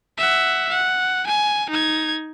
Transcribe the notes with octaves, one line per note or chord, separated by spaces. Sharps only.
E5 F#5
F#5
G#5
D#4 G#6